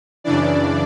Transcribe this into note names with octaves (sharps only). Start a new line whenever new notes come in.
F#2 C#3 E3 D4 D5